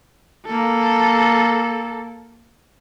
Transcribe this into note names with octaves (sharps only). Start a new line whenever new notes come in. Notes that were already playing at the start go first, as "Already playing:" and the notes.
A#3 A4